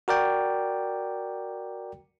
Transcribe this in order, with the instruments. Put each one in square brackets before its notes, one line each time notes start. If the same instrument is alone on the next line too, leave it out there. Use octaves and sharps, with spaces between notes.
[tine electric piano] F#4 A#4 D5 G5